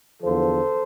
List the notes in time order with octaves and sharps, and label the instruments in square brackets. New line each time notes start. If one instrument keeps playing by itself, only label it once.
[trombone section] E2 D3 F3 A4 C5